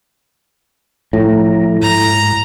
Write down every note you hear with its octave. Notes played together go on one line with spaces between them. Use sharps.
A2 F3 A3 A#5
G#2 A#5